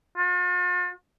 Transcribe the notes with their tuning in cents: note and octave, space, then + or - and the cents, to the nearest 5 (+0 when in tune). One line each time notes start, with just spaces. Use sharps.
F4 +45